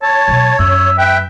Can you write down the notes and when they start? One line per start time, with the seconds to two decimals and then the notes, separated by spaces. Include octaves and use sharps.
0.02 C#5 A5
0.28 B2 F#3
0.59 F#2 E5
0.98 B4 E5 G5